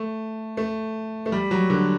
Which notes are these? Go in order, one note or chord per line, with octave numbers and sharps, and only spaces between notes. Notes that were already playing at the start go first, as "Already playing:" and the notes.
Already playing: A3
A3
A3
G3
F#3
D3